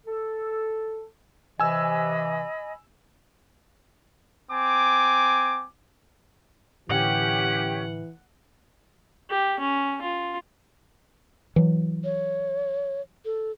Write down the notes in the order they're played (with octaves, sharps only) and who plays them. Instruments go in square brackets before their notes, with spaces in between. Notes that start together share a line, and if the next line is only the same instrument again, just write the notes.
[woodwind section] A4
[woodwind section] C3 E3 [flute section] D#5 B5 [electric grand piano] G#5 E6
[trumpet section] C4 G#5 D6
[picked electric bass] A2 D3 [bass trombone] E3 [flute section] C#4 G4 [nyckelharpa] F#5
[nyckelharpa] G4
C#4
F4
[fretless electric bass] E3 F#3
[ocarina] C#5
A4